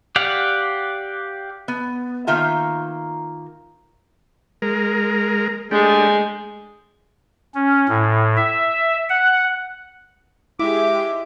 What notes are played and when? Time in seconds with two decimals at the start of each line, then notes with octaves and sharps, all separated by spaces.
0.16 G4 D5 F5 F#5
1.68 B3
2.27 D#3 A#3 F4 E5 G5 A#5
4.62 G#3 A#4
5.71 G#3 A3 D4 G4
7.55 C#4
7.88 A2
8.37 E5
9.09 F#5
10.59 G#3 E4 G4 E5 D6